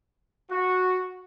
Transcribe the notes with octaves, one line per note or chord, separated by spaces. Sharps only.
F#4